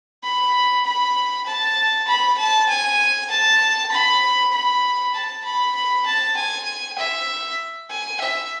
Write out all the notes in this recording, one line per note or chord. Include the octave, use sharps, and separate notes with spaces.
B5
B5
A5
B5
A5
G#5
A5
B5
B5
A5
B5
B5
A5
G#5
E5
G#5
E5